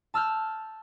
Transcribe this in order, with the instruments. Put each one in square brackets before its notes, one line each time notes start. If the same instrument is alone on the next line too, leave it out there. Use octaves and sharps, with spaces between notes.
[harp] A5 E6 F6 G6